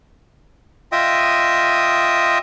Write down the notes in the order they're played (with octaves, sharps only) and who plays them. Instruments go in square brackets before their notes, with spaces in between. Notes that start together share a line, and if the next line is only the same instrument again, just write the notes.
[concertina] F4 D#5 E5 G5 D#6